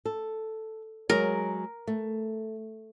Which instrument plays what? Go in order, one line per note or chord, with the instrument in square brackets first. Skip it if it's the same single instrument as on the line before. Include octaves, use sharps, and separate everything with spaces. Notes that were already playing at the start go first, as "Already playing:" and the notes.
[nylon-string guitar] A4
[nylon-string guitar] F#3 G#3 G#4 [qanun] A#4
[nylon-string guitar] A3